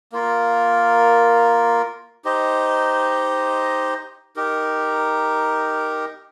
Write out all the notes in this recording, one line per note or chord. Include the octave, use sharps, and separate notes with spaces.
A#3 F4 A#4
D#4 G4 C5 D#5
D#4 G4 A#4